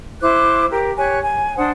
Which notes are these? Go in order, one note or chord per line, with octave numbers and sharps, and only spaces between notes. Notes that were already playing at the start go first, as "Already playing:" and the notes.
E4 C5 D6 F#6
G4 A#4
G4 C#5 G#5 F#6
G#5
D4 C5 F#5 D#6